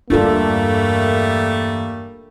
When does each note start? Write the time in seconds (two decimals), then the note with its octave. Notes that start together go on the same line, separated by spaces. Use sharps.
0.10 E2 G2 G3 A3 A#3 D4 F4 A4